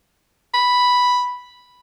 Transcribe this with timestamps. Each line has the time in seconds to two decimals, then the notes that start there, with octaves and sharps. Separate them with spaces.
0.54 B5